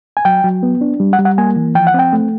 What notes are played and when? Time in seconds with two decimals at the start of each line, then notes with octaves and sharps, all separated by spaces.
0.17 G#5
0.25 F#3 G5
0.44 F#3
0.63 B3
0.81 D4
1.00 G3
1.13 F#5
1.19 G3
1.25 F#5
1.38 A#3 G#5
1.56 E3
1.75 F3 G5
1.87 F#5
1.94 C4 G5
2.13 A3